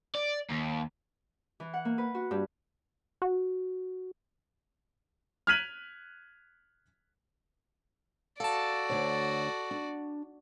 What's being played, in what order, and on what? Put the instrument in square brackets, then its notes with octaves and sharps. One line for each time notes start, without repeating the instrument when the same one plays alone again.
[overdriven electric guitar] D5
D#2
[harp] E3
F#5
A#3
B4
F#4
G2
[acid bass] F#4
[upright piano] F6 F#6 G#6 B6 D#7 F#7
[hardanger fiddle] F#4 D5 [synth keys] A4 A5 [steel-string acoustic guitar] F5
[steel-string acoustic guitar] D2 D3 C#5
D4